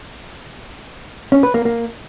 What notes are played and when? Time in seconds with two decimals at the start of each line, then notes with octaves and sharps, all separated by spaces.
1.32 C#4
1.43 B4
1.54 A#3
1.65 A#3